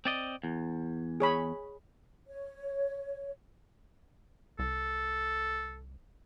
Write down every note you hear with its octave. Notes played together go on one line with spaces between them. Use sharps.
C4 D5 D#5
E2
G#4 C#5 B5
C#5
C2 A4